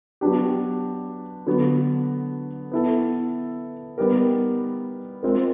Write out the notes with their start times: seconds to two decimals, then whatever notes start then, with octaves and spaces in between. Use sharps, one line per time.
0.21 F#3 B3 D4 G4
1.46 D3 F#3 B3
2.72 B3 E4 A4
3.98 G3 B3 D#4 G4 A#4
5.23 G#3 C4 F4 A#4